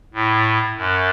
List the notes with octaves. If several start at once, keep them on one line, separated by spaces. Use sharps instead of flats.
A2
F#2